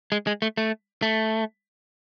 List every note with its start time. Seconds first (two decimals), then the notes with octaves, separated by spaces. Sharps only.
0.12 G#3
0.27 G#3
0.42 A3
0.57 A3
1.02 A3